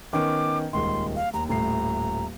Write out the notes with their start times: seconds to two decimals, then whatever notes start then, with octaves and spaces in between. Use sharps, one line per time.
0.13 D#3 B3 C#4 D6
0.73 D#1 C#2 D#3 C6
1.15 F5
1.34 D#2 A#5
1.49 D#1 A2 A#5 C7